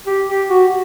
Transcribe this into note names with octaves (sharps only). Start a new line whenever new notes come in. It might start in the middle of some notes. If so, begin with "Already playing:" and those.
G4
G4
F#4